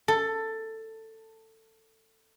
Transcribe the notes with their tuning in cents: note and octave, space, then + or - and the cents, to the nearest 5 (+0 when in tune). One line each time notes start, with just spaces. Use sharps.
A4 +15